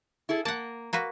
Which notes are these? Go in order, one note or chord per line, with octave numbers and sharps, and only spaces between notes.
E4 G#4 A4
A#3 F#5 A5
A#3 F#4 B4